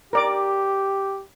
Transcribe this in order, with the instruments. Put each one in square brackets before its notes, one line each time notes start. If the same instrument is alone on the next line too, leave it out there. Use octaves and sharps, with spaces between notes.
[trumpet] G4 [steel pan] A#4 D5 D6